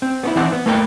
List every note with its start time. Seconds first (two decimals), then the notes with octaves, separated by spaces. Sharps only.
0.02 C4
0.24 B3 C#4 E4
0.36 E3 C4 D#4 D5 F#5
0.52 B3
0.66 A3 A#3 A#4 B4 D5 G5